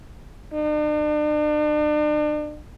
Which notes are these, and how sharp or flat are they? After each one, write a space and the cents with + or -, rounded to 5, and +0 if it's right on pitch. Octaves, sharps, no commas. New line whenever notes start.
D4 +40